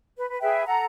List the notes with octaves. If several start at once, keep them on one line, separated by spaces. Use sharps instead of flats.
B4
B4
G#4 B4 E5 G5
A4 F#5 A#5